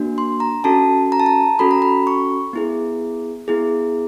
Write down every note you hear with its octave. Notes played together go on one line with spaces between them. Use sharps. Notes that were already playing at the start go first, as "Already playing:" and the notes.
Already playing: A#3 D4 F#4
C6
A#5
C#4 F#4 A4 A5
A#5
A5
A#5
C#4 F#4 A4 B5
A#5
B5
C#6
B3 E4 G#4
B3 E4 G#4